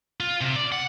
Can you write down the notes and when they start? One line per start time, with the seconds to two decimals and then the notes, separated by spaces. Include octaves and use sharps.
0.20 F4
0.41 C3
0.56 D5
0.72 F#5